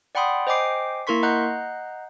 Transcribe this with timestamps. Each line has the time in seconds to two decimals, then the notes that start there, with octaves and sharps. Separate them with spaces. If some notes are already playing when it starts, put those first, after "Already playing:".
0.15 D5 F#5 G5 B5 C6 D#6
0.47 C5 D#5 G5 G#5 D6 C7
1.07 A#3 E4 A#4 C6 C#6 B6
1.23 D#5 F#5 A#5 F#6 G6 C7